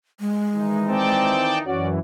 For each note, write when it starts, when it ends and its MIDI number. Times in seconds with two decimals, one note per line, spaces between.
0.20 1.32 56
0.56 1.62 51
0.56 1.62 52
0.56 1.62 63
0.89 1.57 60
0.89 1.58 74
0.89 1.58 79
0.89 1.58 81
1.66 1.98 42
1.66 1.98 52
1.66 1.88 61
1.66 1.88 66
1.66 1.88 74